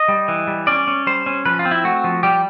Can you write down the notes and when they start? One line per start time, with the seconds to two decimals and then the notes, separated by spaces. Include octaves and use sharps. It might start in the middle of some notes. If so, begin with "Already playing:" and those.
Already playing: D#5
0.08 G3
0.28 E3
0.47 G3
0.67 C#4 D5
0.88 C#4
1.07 G3 C5
1.26 C#4
1.45 F3 B4
1.59 F4
1.65 C4
1.71 E4
1.84 A3 F#4
2.04 F3
2.23 G3 G4